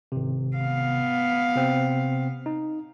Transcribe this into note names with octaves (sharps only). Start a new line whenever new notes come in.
G#1 C3
B3 F5
C3 C4
D#4